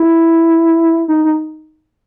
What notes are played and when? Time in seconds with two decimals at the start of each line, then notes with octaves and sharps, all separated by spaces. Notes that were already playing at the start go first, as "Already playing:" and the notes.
Already playing: E4
1.08 D#4
1.25 D#4